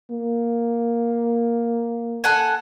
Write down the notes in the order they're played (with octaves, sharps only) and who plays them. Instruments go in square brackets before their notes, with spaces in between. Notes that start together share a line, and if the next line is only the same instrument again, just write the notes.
[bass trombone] A#3
[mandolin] A4 F#5 G#5